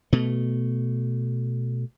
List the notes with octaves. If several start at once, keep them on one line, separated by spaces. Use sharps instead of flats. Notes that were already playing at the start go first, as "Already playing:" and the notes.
B2 A3